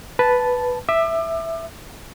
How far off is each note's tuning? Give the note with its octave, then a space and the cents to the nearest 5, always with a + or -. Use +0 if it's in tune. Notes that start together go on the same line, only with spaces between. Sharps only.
B4 +0 A5 -5
E5 +0 D6 +35